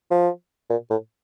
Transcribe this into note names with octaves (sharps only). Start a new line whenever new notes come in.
F3
A#2
A2